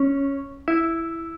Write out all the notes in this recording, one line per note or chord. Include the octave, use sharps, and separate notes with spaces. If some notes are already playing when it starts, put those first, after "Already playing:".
Already playing: C#4
E4